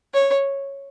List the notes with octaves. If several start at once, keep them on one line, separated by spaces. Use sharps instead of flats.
C#5